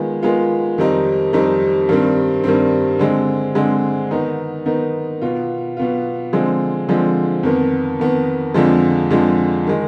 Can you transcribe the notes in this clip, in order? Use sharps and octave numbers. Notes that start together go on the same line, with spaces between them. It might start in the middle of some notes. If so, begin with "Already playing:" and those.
Already playing: D#3 G#3 B3 F4
D#3 G#3 B3 F4
F2 D#3 G3 C4 D#4
F2 D#3 G3 C4 D#4
G2 D#3 G3 C4
G2 D#3 G3 C4
D3 G#3 C4
D3 G#3 C4
D#3 B3 D#4
D#3 B3 D#4
B2 B3 F4
B2 B3 F4
D3 F3 G#3 C4
D3 F3 G#3 C4
F2 D#3 B3
F2 D#3 B3
F2 D3 F3 G#3
F2 D3 F3 G#3
D#3 G#3